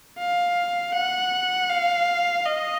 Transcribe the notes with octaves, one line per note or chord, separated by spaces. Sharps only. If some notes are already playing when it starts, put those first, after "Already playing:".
F5
F#5
F5
D#5